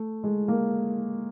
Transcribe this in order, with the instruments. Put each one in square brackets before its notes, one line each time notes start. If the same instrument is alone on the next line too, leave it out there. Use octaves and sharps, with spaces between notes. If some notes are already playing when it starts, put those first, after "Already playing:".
Already playing: [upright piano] A3
G#3
A#3